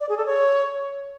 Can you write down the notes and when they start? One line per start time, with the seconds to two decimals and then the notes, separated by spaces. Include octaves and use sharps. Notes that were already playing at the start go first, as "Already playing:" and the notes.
0.01 D5
0.09 G#4
0.18 A4
0.26 C#5